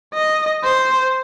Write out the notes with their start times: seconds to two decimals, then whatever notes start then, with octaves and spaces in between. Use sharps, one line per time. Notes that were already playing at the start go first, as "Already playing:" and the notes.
0.14 D#5
0.64 C5